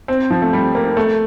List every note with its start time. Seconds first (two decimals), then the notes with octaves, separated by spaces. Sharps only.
0.08 C4
0.31 F3
0.42 A3
0.53 G3
0.75 A#3
0.97 A3